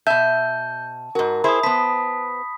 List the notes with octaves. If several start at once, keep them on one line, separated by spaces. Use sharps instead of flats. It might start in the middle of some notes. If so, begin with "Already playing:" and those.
B2 E5 A5 G6
G#2 F#4 A#4
E4 G#4 C5 B5 D#6
B3 C5 A5 B6